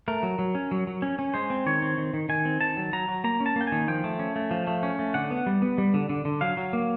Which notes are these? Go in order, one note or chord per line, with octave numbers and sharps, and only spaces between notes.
A3 A#4
F#3
F#3
C#4
F#3
F#3
C#4
C#4
G#3 C5
C4
D#3 C#5
C4
D#3
D#3
D#3 G#5
C4
D#3 A5
F#3
F#3 A#5
F#3
A#3 A#5
C#4
A5
A#3 G5
D#3 G#5
F3 G5
A3
C#4
A3
F3
A3
C#4
A3
D3 F#5
B3
G3
B3
G3
D3
D3
D3
F#3 F5
F#3
A#3